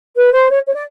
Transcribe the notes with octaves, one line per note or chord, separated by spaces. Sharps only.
B4
C5
C#5
C#5
D5